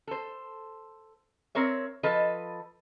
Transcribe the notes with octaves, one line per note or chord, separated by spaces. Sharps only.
A4 C5
C4 A#4 C#5 E5
F3 A4 B4 D#5